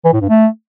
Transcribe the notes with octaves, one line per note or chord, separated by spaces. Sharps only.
E3
A2
G2
A3